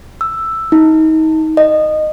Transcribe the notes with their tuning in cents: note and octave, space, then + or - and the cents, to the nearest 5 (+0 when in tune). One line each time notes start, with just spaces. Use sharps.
E6 +5
D#4 +30
D#5 -20